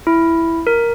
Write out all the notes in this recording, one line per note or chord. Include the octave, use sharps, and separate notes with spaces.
E4
A#4